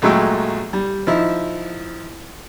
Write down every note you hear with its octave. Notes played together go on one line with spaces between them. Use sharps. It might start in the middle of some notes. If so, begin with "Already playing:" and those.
A#1 F#3 G#3 A3 A4 G5
G3
F3 D#4 E4